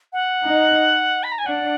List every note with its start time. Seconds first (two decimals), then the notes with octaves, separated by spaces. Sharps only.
0.13 F#5
0.46 D#4
1.23 B5
1.32 A#5
1.38 G#5
1.46 D4 F#5